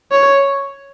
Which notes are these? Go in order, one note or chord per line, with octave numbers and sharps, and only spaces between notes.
C#5